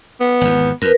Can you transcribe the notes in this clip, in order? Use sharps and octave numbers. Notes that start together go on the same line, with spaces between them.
B3
G#1 E2
F2 A#4 B4